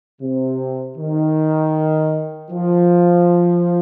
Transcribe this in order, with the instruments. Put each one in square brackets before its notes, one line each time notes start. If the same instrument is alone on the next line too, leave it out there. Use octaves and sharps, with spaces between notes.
[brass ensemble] C3
D#3
F3